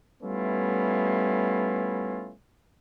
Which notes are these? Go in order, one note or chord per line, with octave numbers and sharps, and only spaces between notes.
G3 A3 B3 C#4 E4 F4